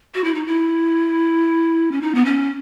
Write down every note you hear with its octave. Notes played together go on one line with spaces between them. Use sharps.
F#4
E4
D#4
E4
C#4
D#4
B3
C#4